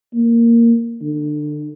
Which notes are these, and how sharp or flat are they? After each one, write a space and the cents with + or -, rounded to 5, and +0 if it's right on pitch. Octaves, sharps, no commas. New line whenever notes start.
A#3 -5
D3 +25